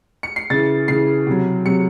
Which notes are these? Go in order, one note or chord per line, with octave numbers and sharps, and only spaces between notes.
C#7
C7
C#3 E3 A6
C#3 E3 C7
C3 F#3
C3 F#3 C#7